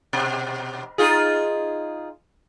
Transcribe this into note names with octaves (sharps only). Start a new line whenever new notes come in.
B2
D#4 F4 G#4